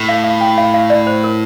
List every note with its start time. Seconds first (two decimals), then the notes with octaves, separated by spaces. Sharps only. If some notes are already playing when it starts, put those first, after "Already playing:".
Already playing: A2
0.09 F5
0.24 F5
0.41 G5
0.58 F5
0.74 F5
0.90 D5
1.07 C5
1.24 A#4